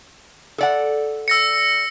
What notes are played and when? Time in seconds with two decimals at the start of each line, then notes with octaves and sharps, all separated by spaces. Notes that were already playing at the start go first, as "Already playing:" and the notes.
0.58 A4 D5 F#5
1.28 E6 A#6 C#7